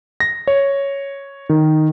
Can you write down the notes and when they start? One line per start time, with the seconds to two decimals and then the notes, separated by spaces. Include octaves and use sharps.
0.20 A#6
0.47 C#5
1.49 D#3